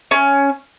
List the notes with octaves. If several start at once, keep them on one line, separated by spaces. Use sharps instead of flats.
C#4